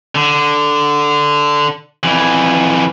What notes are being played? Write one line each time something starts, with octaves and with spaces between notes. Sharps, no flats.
D3
F2 E3